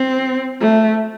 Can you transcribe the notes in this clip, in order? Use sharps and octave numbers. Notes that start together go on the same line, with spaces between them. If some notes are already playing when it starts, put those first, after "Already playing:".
Already playing: C4
A3